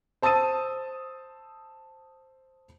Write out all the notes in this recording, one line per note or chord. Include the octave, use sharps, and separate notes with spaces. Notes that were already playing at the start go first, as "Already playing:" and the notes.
C5 A5 D#6 E6 A6 D#7